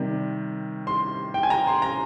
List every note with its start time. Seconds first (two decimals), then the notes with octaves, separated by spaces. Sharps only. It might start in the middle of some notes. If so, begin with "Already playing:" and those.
Already playing: C3 D#3 G3
0.87 C6
1.34 G5
1.43 G#5
1.50 A#5
1.67 C6
1.82 A#5